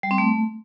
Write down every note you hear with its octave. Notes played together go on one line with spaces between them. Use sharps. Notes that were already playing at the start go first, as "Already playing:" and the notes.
G3
C4
A3